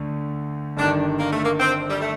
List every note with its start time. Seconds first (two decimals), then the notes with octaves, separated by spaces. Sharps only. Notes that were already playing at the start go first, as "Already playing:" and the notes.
Already playing: D2 D3 A3
0.77 G1 G2 D#3 D4
1.19 A#3
1.31 A3
1.45 A#3
1.60 C4
1.90 G3
2.01 A3